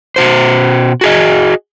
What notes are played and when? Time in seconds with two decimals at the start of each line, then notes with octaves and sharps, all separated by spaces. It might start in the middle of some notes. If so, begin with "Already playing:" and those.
0.16 B2 F#4 C5
1.01 F#4 G#4 D#5